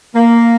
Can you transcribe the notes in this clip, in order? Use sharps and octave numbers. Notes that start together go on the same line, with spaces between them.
A#3